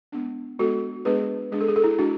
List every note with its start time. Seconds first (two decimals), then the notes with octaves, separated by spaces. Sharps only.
0.12 G#3 B3 D4
0.59 G#3 B3 D4 F#4 A4
1.05 G#3 B3 D4 G#4 B4
1.52 G#3 D4 G#4
1.61 A4
1.68 G#4
1.76 A4
1.84 E4 G#4
1.99 G#3 D4 F#4